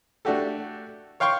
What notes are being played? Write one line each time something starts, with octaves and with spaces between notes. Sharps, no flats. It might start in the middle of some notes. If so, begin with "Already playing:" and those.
A3 D4 F#4 G4 A4
C#5 F5 G5 C6 C#6